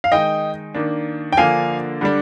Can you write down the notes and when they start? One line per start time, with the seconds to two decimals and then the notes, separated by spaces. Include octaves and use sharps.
0.04 F5
0.12 D#3 G#3 D#4 D#5 G5
0.75 D#3 A#3 D4
1.33 G5
1.37 D3 F3 A#3 D4 F5 G#5
2.01 D3 G3 D4